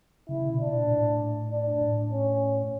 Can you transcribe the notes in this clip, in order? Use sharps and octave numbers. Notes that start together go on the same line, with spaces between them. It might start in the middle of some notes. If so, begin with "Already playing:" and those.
C#3 E4
C#3
B2
A#2 D4
A2
D4
A2
C#4